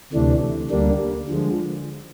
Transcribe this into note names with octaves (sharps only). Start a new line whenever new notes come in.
D2 C3 E3 A3 D4
D2 D3 G3 A#3 D4
D3 F3 G#3